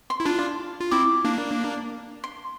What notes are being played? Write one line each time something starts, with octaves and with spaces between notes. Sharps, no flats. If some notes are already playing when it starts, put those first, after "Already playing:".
C6
E4
D4 F4 C6
F4
C4 E4 D6
A#3 D4
C6